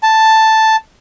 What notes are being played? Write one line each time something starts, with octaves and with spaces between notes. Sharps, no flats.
A5